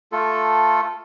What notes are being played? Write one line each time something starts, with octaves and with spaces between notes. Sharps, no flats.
A3 F4 A4